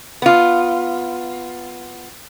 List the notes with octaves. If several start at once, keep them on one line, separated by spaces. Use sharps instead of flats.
B3 F4